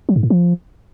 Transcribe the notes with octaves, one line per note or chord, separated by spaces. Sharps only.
F#3
G#2
A2
F3